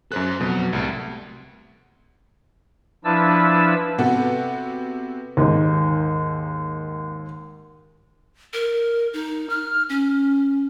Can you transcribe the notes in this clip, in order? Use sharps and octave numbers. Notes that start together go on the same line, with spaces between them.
F#2 A4 C5 F#6
F2 B2 F#3
C2 A2
F3 D4 E4 B4 A5 E6
C3 B3 F#4 A4
D#2 G#2
A#4
D#4
F6
C#4